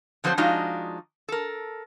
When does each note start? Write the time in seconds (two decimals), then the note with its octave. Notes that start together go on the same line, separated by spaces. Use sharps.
0.24 D3 F3 F#3 C4 C5
0.38 F3 G#3 D4 D#4 F4 F#4
1.29 A4 A#4